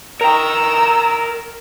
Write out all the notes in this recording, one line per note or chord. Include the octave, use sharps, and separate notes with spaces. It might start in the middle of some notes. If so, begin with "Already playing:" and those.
A#4 G5 A#5 E6